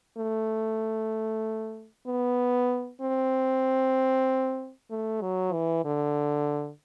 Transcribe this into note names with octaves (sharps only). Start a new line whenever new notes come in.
A3
B3
C4
A3
F#3
E3
D3